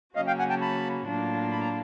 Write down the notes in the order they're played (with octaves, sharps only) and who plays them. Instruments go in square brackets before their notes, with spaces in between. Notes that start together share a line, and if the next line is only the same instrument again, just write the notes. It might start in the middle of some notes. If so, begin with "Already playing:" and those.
[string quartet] C#3 F#3 A#3 C#4 F#4 [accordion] D#5 F5
[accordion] F5 G5
F#5 G#5
G5 A5
A5 B5
[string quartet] A2 F#3 A#3 D4 F4
[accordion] B5
A#5